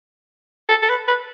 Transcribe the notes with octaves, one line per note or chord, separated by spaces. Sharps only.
A4
A4
B4
B4